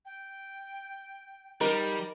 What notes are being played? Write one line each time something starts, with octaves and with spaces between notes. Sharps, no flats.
G5
G3 D#4 A#4